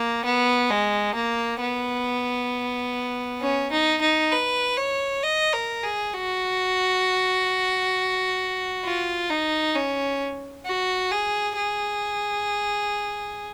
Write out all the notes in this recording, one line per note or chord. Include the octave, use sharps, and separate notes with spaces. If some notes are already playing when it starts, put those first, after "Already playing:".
Already playing: A#3
B3
G#3
A#3
B3
C#4
D#4
D#4
B4
C#5
D#5
A#4
G#4
F#4
F4
D#4
C#4
F#4
G#4
G#4